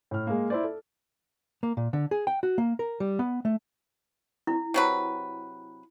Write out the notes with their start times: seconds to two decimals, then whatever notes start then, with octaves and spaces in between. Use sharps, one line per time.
0.11 A2 F6
0.27 G#3 A#3
0.50 E4 C5 D5
0.64 A4
1.63 A#3
1.77 A#2
1.93 D3
2.11 G#4
2.27 G5
2.43 F#4
2.58 A#3
2.79 A#4
3.00 G3
3.19 B3
3.45 A3
4.47 E4
4.74 C3 F#3 B4